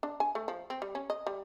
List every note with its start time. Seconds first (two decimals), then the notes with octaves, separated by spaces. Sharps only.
0.03 D4
0.20 G#5
0.35 A3
0.48 F3
0.70 C4
0.82 G3
0.95 C#4
1.10 D#5
1.27 G3